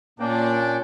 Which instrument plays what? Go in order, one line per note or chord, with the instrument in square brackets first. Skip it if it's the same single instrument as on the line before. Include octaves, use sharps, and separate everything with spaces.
[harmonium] A#2 [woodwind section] A#3 [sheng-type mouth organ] C#4 G5 [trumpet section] D4